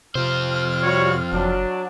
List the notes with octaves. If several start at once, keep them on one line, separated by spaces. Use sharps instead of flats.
F2 C3 F4 C5 F6
G3 F#4 C#5
F#1 F#3 D4